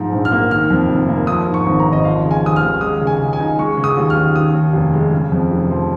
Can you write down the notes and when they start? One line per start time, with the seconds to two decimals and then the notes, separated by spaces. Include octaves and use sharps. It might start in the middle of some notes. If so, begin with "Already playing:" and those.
Already playing: G#2 F3
0.12 A#1
0.25 F6
0.32 A#3
0.50 D#3 F6
0.70 F2
0.89 F1
1.09 A#3
1.27 F3 D#6
1.47 G#2
1.54 C#6
1.66 G#1
1.80 A#5
1.86 G#1
1.93 D#5
2.05 F3 F5
2.24 C#3
2.31 G#5
2.43 D#2 D#6
2.56 F6
2.62 D#2
2.81 G#3 D#6
3.01 C#3
3.07 G#5
3.20 C#2
3.33 G#5
3.40 D#4
3.58 G#3 C#6
3.77 C#3
3.84 D#6
3.97 D#2
4.10 F6
4.16 D#2
4.36 D#3 D#6
4.54 D#2
4.73 F1
4.93 G#3
5.13 C#3
5.32 F2
5.51 F1
5.71 F3